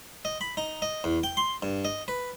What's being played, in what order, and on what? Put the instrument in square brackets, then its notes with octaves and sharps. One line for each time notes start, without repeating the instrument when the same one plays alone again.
[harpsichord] D#5
B5
D#4
D#5
E2
G5
C6
G2
D#5
B4